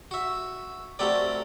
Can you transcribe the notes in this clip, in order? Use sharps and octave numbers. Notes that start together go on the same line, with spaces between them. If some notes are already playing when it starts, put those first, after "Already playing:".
F#4 E5
A3 C4 F#4 G4 A#4 D5